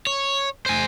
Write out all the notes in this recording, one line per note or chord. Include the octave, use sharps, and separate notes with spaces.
C#5
C5 G#5